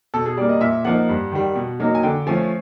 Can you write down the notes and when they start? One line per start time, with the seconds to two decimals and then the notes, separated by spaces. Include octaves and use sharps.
0.14 B2 A4
0.26 G#4
0.37 G3 A#3 D5
0.49 D#5
0.61 A#2 E5
0.85 F3 A#3 D#4 F#5
1.09 G2
1.32 D#3 G3
1.55 B2
1.80 F#3 A#3 D#4
1.95 G#5
2.03 D3 G5
2.27 F3 A3 C#4 G#5